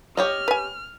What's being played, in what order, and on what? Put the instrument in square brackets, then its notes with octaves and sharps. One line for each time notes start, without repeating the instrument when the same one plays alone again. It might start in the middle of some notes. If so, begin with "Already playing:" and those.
[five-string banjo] G4 C#5 D#5 [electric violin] F6
[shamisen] B4 G#5